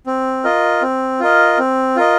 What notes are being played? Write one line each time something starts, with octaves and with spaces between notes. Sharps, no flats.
C4
F4 A#4 D#5
C4
F4 A#4 D#5
C4
F4 A#4 D#5